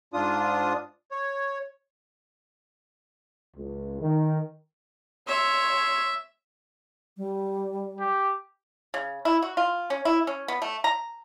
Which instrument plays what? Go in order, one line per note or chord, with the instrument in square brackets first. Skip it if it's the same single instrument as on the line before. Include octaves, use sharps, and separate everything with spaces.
[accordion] G#2 D4 F4 D#6
C#5
[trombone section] C#2
D#3
[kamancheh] C#5 C6 [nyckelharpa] E5
[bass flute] G3
[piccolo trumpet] G4
[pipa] C#3
E4
F#4
F4
C#4
E4
C#4
B3
A3
A#5